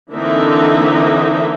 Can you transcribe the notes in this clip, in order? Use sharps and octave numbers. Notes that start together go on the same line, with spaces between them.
D3 E3 A#3 C4 D#4 E5